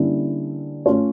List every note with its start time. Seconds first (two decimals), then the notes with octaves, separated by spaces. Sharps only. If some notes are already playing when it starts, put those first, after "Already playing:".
Already playing: D3 G3 A#3 C#4 E4
0.86 A3 C#4 F4 C#5